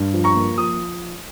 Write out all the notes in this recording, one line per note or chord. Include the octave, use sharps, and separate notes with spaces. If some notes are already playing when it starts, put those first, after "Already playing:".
Already playing: G2
F3
A#5 C#6
A#3
F3 D#6